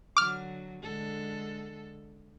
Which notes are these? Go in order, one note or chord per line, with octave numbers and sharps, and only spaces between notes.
D3 F#3 D6 F6
D3 G#3 A4